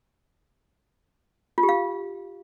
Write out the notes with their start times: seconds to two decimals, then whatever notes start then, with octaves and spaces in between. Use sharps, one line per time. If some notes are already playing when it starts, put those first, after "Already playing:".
1.58 F4
1.63 G4
1.69 F5